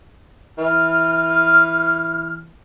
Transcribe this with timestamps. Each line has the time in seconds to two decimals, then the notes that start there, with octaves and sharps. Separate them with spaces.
0.58 E3 F6